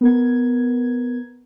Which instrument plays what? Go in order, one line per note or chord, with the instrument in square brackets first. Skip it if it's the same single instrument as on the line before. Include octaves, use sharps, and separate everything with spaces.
[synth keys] B3 A#4 G#6